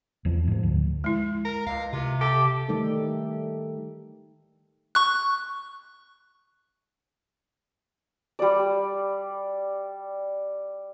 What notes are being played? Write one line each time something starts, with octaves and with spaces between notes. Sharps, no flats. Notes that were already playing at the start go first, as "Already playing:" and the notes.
E2 F3
G#2 F3
D2
G#3 E4
A#4
C#2 F5
C3 F4
G4 A4
D#3 G3 A3 D#4 A4
C#6 F#6
G3 D5